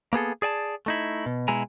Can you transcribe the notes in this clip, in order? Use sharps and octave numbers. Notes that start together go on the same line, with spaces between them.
A#3 B3 G#4 A4
G#4 D5 G#5 A5
A3 D#4 E4
B2
B2 G#3 E4 G#5 A#5